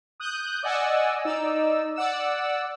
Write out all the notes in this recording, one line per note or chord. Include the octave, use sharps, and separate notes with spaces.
D#6 F#6 G6
D5 D#5 F#5 G#5 E6
D#4 D5 E6
D5 F#5 E6